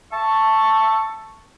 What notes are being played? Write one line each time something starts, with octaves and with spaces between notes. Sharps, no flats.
E5 A5 C#6